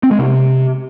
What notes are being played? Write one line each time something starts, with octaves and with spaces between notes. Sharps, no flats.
C4
G#3
C3